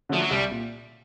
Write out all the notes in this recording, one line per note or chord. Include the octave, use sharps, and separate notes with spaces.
D3 F3 F#3 A3 D4
F#3
C2 G3
A#2